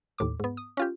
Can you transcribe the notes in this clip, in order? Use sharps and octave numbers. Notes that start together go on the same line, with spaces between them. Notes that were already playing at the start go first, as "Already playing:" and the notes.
D#2 A2 D6
G#2 B3
D#6
C#4 F4 G4